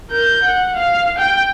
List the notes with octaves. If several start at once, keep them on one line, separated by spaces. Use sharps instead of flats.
A#4 G6
F#5
F5
G5